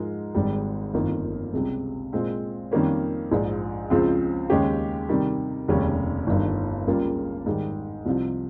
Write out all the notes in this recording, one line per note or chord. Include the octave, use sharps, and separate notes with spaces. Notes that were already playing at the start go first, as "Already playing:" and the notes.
Already playing: G#2 F3 G#3 D#4 A#4
G#1 G#2 G3
G1 F2 D#3 A#3 F4
C#2 C3 G3
A#2 G#3 C4
F2 D#3 G3 A#3 C#4
A#1 G#2 F3
C#2 C#3 F3 C4
D#2 C#3 G#3 C#4 G4
C3 D#3 G3
F1 D#2 C#3 G3 C#4
G1 G2 D#3
C#2 C#3 G3 A#3 F4
G#2 D#3 G3
C2 C3 F3